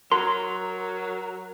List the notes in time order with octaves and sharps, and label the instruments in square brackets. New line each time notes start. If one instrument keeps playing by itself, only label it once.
[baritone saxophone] F#3 [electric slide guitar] A#4 [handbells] C6